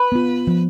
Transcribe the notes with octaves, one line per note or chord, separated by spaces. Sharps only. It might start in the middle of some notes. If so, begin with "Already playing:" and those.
Already playing: B4
B3 F4
F3